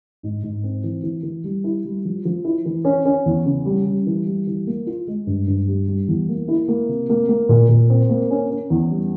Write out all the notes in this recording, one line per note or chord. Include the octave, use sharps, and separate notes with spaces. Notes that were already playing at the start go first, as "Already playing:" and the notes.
G#2
G#2
C4
E3
E3
E3
G3
E4
G3
F3
F3
E4
E3
C#4
C#4
E2
C#3
G3
G3
E3
G3
E3
A#3
F4
G#3
G2
G2
G3
G3
E2
A#3
E4
A#3
C3
A#3
A#3
A#2
A#2
C4
A#3
C#4
C#4
E2
G3